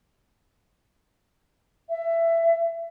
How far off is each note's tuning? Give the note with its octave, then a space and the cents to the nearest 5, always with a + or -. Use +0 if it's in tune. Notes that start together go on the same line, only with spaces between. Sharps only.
E5 +20